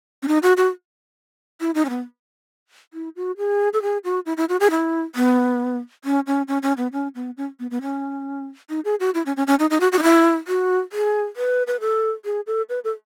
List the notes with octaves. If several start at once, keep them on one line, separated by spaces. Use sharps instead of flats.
C#4
D#4
F#4
F#4
E4
D#4
C#4
B3
E4
F#4
G#4
A4
G#4
F#4
E4
E4
F#4
G#4
E4
B3
C#4
C#4
C#4
C#4
B3
C#4
B3
C#4
B3
B3
C#4
D#4
G#4
F#4
E4
C#4
C#4
C#4
D#4
D#4
F#4
F#4
D#4
E4
F#4
G#4
B4
B4
A4
G#4
A4
B4
A4